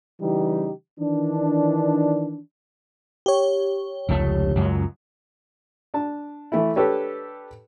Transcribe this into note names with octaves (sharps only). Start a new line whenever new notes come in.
C#3 E3 G3 D#4 G4
D#3 E3 D4
G4 C#5
F1 C#2 A3
C#2 F#2 F#3
D4 A5
E3 A3 E4
D4 G4 A4 B4 C#5